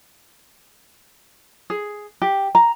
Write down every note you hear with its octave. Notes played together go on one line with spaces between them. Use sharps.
G#4
G4
A#5